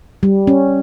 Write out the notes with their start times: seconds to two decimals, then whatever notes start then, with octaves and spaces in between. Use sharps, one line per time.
0.23 G3
0.47 C#4